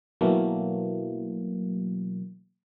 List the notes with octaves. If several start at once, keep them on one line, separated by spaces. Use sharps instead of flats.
B2 E3 F#3 A3 A#3